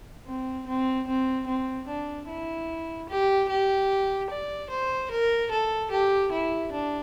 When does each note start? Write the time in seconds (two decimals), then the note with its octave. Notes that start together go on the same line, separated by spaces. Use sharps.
0.26 C4
0.67 C4
1.07 C4
1.47 C4
1.87 D4
2.28 E4
3.09 G4
3.49 G4
4.30 D5
4.69 C5
5.11 A#4
5.51 A4
5.91 G4
6.31 E4
6.72 D4